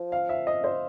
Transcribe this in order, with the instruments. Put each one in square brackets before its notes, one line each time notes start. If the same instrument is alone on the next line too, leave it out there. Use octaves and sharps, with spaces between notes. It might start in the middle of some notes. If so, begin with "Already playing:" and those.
Already playing: [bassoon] F3
[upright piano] F5
E5
D#5
C5